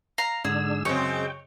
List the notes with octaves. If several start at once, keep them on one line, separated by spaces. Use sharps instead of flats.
F5 A#5
G#2 D3 D4 G#4 E6
F#2 C#3 G#3 C4 C#5 G5